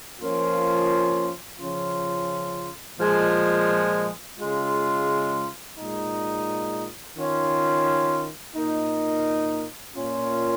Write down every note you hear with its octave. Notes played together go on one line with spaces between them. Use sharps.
F3 A#3 C#4 F4
C#3 F3 C#4 F4
A#2 F3 G#3
C#3 G#3 F4
A#2 G#3 D#4
D#3 C#4 F4
A#2 A#3 D#4
A#2 A#3 C#4 F4